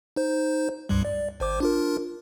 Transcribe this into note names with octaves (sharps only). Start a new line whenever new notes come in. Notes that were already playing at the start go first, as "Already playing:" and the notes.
D#4 C5
C#2 G2 G3
D5
G#1 C5 D6
D4 F4 A#4